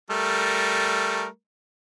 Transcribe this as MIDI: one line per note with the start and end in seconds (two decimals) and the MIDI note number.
0.10 1.27 55
0.10 1.27 57
0.10 1.27 70